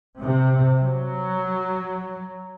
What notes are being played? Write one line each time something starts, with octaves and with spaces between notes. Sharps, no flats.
C3
F#3